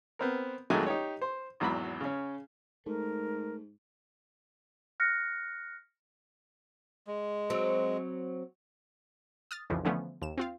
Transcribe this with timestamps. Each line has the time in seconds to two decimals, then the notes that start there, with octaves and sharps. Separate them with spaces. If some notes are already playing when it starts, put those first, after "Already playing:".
0.19 B3 C4 A#4
0.70 F2 D#3 F#3 G#3 A3 G#5
0.86 D#4 G4 C#5
1.21 C5
1.60 G#1 E2 F#3 A#5 B5
2.01 C#3 C#4
2.86 G#2 A3 A#4
5.00 F6 F#6 A#6 C#7
7.07 G#3
7.50 F#3 C4
9.51 D#6 F6 A6
9.70 B1 F2 C#3 E3 F3
9.85 D3 E3 F3 A3 B3 C#4
10.22 D#2 E7
10.38 C4 F4 F5